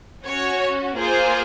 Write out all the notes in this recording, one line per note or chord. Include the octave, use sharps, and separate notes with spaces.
C#4 F#4 C#5
A#3 F4 G#4 C5